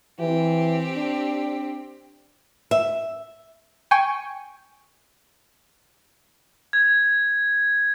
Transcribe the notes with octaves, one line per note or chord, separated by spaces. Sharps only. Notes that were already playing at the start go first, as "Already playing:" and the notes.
E3 C4 G4
D4
E5
G5 G#5 C#6
G#6